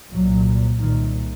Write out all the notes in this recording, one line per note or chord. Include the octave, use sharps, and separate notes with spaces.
C2 A#2 F#3
C2 A#2 D#3